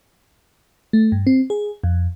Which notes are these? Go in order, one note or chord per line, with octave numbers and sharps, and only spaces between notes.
A3
G2
C4
G#4
F2